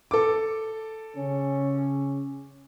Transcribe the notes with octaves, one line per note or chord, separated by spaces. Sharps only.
A4 D6
C#3 C#4